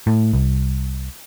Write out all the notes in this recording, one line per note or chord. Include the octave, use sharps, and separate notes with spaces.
A2
C2